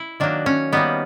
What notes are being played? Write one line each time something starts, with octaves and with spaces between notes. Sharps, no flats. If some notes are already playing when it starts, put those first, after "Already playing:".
Already playing: E4
D#3 F#3 A#3 D4
C#4
D#3 G3 A#3 B3